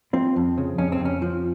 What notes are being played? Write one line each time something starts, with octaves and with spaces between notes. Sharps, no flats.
F3 C4
F2
C#3
F2 C#4
C4
F2
C#4
F3